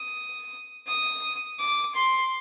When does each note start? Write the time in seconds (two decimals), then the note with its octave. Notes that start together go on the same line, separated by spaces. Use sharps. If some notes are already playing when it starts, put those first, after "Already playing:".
Already playing: D#6
0.87 D#6
1.59 D6
1.94 C6